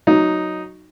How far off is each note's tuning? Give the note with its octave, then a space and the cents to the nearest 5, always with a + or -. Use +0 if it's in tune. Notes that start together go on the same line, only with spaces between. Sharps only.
F#3 +0 D#4 +0